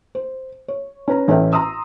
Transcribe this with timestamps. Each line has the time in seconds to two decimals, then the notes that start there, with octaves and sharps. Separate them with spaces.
0.15 C5
0.68 C#5
1.08 C#4 B4 A#5
1.28 A1 C#4 A4 B4 E5 G5
1.53 A#5 C6 D#6 E6